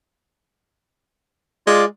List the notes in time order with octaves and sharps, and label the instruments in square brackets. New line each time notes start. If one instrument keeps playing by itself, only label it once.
[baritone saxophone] G#3 [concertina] F4 D5